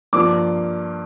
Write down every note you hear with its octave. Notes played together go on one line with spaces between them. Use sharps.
G2 F3 A#3 F4 D6